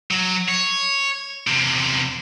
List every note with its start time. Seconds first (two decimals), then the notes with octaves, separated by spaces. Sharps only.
0.11 F#3
0.49 C#5
1.47 E2 C3